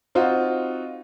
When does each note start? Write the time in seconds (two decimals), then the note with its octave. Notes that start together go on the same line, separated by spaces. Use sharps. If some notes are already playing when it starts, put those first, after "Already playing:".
0.15 C4 D#4 F4 F#4 C5